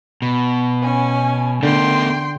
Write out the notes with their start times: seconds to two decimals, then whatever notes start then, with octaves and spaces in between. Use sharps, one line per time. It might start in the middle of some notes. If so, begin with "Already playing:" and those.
0.22 B2
0.82 C#4 G#5
1.63 D3 B3 A4 A#4 G5 C6